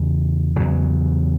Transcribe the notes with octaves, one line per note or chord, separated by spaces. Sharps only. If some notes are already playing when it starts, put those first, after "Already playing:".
Already playing: E2 C#3
E2 C#3 F#3